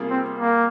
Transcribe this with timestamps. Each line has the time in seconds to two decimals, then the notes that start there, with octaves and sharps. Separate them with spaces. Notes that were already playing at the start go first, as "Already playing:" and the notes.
Already playing: C3 G3 A#3 F4 G#4
0.10 C4
0.39 A#3